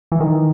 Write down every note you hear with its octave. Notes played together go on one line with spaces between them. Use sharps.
E3
D#3